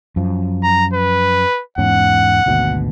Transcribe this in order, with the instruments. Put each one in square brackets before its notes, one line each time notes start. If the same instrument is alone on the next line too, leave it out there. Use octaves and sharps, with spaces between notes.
[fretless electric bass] F#2 F3
[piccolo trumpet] A#5
B4
[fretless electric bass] E2 G#2 C#4 [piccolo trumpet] F#5
[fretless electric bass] G#1 D2 B2